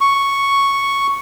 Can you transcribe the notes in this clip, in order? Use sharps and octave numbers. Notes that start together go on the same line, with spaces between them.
C#6